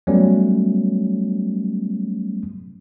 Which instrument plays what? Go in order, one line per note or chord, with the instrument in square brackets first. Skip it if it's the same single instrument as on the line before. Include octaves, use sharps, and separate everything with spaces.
[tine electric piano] F#3 G3 A3 B3 C#4